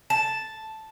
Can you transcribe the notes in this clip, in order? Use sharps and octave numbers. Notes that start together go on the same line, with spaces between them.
A5